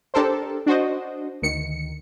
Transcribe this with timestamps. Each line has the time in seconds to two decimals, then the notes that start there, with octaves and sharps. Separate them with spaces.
0.14 D4 G4 A4 A#4 C5
0.66 D4 F#4 C5 D#5
1.42 D2 D#3 C#7